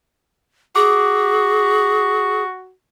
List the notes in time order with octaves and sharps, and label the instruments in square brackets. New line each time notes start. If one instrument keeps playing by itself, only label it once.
[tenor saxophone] F#4 [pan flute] G#4 [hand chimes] D6